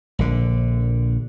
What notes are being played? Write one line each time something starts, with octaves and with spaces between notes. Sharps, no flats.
A#1 D3